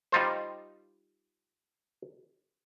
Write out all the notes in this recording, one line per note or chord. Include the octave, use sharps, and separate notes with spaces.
G3 D#4 F4 C5